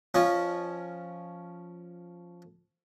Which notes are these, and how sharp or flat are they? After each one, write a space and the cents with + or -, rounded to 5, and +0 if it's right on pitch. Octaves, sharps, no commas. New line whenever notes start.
F3 +0 C#4 +0 D#5 -35